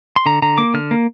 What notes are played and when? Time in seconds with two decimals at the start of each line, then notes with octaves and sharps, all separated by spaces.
0.16 C6
0.26 D3 A#5
0.42 D3 A#5
0.58 A#3 D6
0.74 D3 F6
0.91 A#3